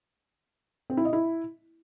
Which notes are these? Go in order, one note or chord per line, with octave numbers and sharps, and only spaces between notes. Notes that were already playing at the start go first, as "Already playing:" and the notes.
C4
E4
D#5
E4